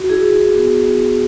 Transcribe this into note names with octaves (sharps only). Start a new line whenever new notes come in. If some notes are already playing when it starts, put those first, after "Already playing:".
Already playing: F#4
E4 G#4
E4
B3
B3
E4